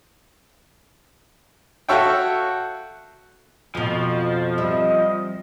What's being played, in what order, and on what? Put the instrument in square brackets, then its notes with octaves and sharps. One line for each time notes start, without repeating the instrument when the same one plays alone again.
[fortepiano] F#4 A4 C#5 E5 F5 G5
[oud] F2 B2 [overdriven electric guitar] F3
[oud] G3 E5 [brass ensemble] C4 D#5